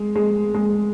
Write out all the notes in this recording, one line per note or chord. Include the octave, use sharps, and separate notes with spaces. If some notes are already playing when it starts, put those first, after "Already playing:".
Already playing: G#3
G#3
G#3